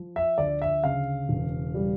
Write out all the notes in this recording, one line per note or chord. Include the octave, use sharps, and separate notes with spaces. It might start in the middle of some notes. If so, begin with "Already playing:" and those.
Already playing: F3
E5
D2 D5
E5
C#3 F5
E1
G3